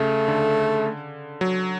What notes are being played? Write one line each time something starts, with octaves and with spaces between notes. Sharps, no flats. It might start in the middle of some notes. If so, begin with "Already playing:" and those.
Already playing: C#3 A3
D3
F#3